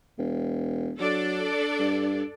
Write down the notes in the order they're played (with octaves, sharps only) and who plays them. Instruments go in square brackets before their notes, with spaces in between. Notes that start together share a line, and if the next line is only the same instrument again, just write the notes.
[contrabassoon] E1
[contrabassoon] F#3 [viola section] D4 A4 D5
[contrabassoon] G2